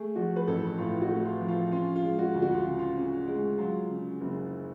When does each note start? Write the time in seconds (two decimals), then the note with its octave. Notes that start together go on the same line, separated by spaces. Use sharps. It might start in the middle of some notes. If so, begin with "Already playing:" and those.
Already playing: A3 G#4
0.16 F3 F#4
0.36 B4
0.47 A1 A4
0.78 A2 F4
1.02 F#4
1.10 A3
1.25 F4
1.41 F3
1.48 F4
1.71 C#4 F4
1.96 F4
2.03 G#3
2.19 F#4
2.34 D2
2.42 F#4
2.54 F4
2.65 C#3
2.79 F4
2.96 C#4
3.28 G#3
3.58 F#3 F4
3.90 C#3
4.21 F#1